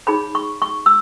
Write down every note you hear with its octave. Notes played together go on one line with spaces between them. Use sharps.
D#4 G#4 C#5 B5
C#6
C#6
E6